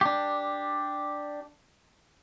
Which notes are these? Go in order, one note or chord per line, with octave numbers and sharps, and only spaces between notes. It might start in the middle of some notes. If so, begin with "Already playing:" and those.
D4 G4